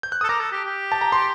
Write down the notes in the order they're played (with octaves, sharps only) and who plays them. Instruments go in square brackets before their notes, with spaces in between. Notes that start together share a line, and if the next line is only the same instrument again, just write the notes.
[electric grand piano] G6
F#6
[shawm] A4 [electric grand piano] D#6
[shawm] A#4 [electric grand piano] D6
[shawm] A4
G4
G4
[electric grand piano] A5
A#5
C6